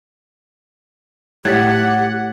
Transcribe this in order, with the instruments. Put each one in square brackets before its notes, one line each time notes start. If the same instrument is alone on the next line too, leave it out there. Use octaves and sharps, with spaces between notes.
[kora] A2 [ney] G4 [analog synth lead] F#5 [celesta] G#6 A6 B6